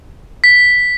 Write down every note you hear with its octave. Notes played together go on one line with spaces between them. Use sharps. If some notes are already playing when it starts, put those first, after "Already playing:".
B6